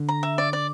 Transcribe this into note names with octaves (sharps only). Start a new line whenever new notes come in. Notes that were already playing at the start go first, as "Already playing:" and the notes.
Already playing: D3
A#5
E5
D5
D5